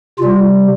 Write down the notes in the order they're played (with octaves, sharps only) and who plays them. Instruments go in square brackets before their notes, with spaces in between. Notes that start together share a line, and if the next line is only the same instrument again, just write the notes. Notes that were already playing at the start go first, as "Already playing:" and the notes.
[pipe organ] C3 G3 F4